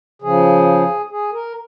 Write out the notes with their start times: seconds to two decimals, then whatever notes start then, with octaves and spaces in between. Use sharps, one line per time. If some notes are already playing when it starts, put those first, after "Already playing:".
0.22 C#3 F3 G#4
1.10 G#4
1.33 A#4